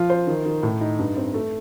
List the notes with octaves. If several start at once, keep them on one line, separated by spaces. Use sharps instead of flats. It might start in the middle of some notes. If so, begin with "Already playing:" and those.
Already playing: F3 F4
C5
D#3
D#3
A2
D#4
G2
C4
A3